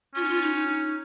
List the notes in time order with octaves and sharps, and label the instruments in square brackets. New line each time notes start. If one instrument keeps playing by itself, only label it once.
[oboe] C#4 [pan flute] F4
[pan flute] D#4
F4
D#4
D#4
D#4